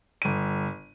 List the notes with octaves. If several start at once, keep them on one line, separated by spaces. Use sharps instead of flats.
G1 D#7